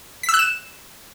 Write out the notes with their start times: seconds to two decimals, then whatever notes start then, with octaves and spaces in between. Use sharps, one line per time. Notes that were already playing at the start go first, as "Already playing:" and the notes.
0.23 B6
0.29 E6
0.34 F#6
0.39 E7